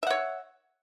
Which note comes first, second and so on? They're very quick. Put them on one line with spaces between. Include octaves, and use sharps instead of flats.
E5 F#5 C#5